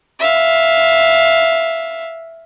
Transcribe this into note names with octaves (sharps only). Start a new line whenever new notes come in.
E5 F5